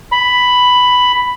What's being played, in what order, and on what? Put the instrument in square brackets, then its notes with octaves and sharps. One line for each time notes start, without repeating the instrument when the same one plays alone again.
[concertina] B5